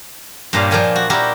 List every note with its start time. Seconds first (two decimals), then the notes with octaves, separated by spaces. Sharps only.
0.53 G2 A#2 A#3 G4 C#5 F5
0.71 F3 A#3 D4 A#4 G5 G#5
0.96 F#4
1.10 G3 E4 F#4 G4 A#4